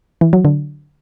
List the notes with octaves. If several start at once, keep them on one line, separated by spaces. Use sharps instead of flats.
E3
F#3
D3